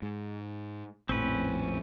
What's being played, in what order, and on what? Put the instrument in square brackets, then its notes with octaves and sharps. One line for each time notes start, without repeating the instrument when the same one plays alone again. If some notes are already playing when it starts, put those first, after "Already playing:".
[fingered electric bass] G#2
[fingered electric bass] A#1 F2 A2 [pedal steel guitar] C4 C#4 B4